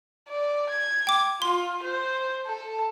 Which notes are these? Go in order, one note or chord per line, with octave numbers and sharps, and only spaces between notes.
D5
G#6
G5 D6
F4 C6
C5
A4